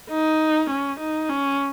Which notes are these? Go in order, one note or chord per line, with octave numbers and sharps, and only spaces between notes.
D#4
C#4
D#4
C#4